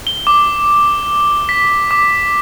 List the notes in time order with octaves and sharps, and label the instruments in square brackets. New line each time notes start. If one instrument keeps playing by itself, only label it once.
[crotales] G7
D6
B6
D6